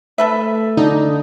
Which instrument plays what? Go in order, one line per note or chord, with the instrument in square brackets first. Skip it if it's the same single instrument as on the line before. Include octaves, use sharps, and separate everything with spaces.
[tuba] A3 [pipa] A4 B4 E5
[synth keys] D3 D4 [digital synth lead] D#4